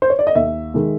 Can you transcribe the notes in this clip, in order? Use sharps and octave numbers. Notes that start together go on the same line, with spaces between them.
C5
C#5
D5
D#5
D#2 E5
D#3 G#3